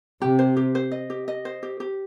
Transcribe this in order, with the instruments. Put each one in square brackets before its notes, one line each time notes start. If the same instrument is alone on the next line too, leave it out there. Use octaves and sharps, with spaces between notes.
[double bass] C3 [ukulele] G4
[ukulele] C5
G4
C5
D#5
G4
D#5
C5
G4
G4